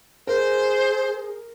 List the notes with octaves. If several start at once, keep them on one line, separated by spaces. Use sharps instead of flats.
G#4 A#4 C5